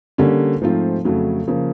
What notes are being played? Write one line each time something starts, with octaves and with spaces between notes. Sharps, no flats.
D3 G3 A#3 C#4
G#2 F3 A3 C4 F4
F2 C#3 F#3 A3
C#3 F3 A#3